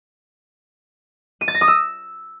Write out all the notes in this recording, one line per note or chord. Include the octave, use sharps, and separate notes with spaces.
D#7
A6
A#6
D#6
E6